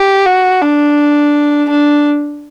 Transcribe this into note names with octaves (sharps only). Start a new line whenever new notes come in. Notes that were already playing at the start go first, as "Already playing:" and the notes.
Already playing: G4
F#4
D4
D4